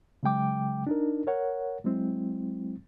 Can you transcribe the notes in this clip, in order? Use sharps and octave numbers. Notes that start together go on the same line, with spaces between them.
C#3 F#3 G#3 G5 D6
D4 D#4 A#4
A#4 C#5 F#5
F#3 G#3 C4 E4